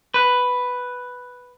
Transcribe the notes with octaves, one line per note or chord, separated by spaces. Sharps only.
B4